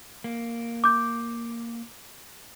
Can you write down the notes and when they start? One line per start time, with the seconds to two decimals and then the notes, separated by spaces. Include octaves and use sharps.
0.24 A#3
0.84 D6 G6